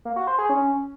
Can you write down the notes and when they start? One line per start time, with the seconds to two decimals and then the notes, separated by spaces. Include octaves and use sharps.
0.05 A#3
0.16 F#4
0.27 C5
0.38 G#4
0.49 C#4